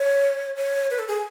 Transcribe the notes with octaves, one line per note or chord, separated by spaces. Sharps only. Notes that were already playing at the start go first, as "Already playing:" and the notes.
Already playing: C#5
C#5
B4
A4
G#4